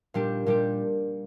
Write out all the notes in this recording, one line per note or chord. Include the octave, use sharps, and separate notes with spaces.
A#2 G3 D4 G4
A#2 G3 D4 G4